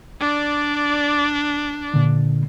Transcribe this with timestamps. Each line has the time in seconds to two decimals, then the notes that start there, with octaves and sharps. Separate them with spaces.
0.20 D4 D5
1.94 A#2 D3